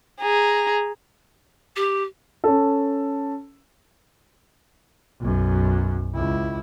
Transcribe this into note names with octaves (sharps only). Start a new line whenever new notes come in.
G#4 A#5
G4
C#4 A4
B1 F#2
C#2 E4